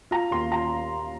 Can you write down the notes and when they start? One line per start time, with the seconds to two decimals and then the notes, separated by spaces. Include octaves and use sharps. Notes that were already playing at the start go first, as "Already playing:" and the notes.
0.11 F4 A#5
0.31 D#2 C6
0.51 F4 A#5